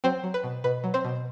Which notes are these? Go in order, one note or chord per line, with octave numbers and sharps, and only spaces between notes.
F#3 C4 C5
F#3
B4
B2
B2 B4
F#3
C4 C5
B2